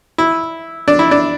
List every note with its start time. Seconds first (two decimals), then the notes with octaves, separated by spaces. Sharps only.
0.18 E4
0.88 D4
0.99 E4
1.11 D4